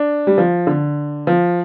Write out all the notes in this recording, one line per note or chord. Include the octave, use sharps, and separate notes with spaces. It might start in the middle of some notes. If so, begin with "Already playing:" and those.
Already playing: D4
G3
F3
D3
F3